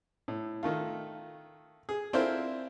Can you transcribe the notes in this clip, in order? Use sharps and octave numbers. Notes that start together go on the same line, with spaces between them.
A2
D#3 A3 F4
G#4
C4 D4 E4 F4 A#4 C5